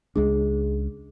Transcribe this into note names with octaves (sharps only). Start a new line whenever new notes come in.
C#2 G#3 D4 G#4